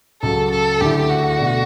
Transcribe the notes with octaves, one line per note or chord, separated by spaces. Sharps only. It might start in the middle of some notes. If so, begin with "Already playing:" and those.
C#2 C#3 F#3 A4
A4
D2 D3 A3 E4 G4
F#4
B2 A3 D4